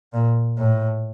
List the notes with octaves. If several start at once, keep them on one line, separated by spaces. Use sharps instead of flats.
A#2
A2